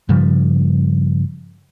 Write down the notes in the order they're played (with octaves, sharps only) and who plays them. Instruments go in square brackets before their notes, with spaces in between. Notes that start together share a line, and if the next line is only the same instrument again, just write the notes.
[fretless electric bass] G2 C#3 F3 G3